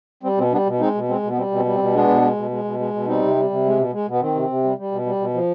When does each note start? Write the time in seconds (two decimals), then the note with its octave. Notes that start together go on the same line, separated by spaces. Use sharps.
0.23 G3 C4
0.37 B2 C4
0.52 G3 B3 D4
0.66 B2
0.80 G#3 C4 D#4
0.95 B2
1.09 G#3 C4
1.23 B2
1.31 B3
1.37 G3 C4
1.51 B2 C4
1.65 G3
1.74 C4
1.80 B2
1.94 G#3 B3 D4
2.08 B2
2.22 G#3
2.36 B2
2.51 G#3
2.64 B2
2.79 G#3
2.93 B2
3.07 G3 C4 D#4
3.22 C3
3.35 G3
3.50 C3
3.64 G#3
3.78 B2
3.93 G#3
4.07 B2 B3
4.21 D#3 C4
4.35 C3
4.49 C3
4.64 G3
4.78 G3
4.91 B2
5.06 G3
5.20 B2
5.34 F3